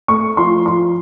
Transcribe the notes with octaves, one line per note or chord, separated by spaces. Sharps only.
A3 C#6
F3 C6
F3 C6